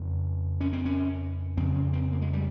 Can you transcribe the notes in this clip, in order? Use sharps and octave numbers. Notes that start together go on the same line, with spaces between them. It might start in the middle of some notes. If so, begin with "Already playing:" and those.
Already playing: F2 C#3
C#4
C4
C#4
F2 C#3 C4
C#4
C4
A#3
G#3
G3